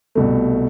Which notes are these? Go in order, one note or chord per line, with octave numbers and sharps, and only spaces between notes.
C2 B2 A3